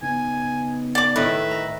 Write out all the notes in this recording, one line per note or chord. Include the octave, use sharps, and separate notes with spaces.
C#3 B3 D#4 G#5
D5 D6
A2 D#3 B4 D#5 E5
A#5